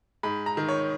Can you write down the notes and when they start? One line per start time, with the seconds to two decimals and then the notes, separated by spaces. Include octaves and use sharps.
0.23 G#2 B5
0.46 A#5
0.57 D#3
0.68 C#5